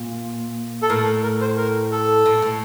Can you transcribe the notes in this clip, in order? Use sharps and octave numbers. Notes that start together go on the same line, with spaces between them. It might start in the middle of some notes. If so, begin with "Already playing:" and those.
Already playing: A#2
A4
A2 A#4
A#4
C5
A#4
A4
A2
A2